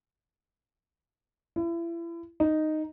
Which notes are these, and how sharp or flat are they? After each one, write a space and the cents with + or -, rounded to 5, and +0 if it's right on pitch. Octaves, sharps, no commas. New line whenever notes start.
E4 +35
D#4 -5